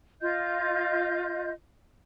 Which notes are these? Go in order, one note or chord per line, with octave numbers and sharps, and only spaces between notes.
F4 D#5 G6